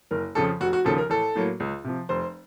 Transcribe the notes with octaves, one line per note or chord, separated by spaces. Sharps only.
F#1 A#4
F2 C#3 F3 A4
F1 F#4
F#4
D#2 C#3 F3 A4
A#4
A1 A4
A2 F#3 A#3
C#2
C3 F3
F1 C5